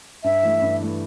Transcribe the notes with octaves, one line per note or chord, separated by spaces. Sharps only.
G2 E5
E3 A3
G2
E3 A3